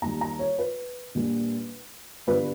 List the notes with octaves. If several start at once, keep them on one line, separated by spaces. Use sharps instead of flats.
D#2 D#3 G3 A#5
A#5
C#5
B4
A#1 A#2 G3
G1 G2 G3 B4